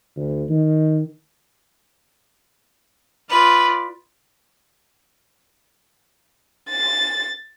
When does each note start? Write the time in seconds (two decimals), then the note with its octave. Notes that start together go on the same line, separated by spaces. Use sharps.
0.16 D2
0.49 D#3
3.30 F4 B4 D5
6.69 A6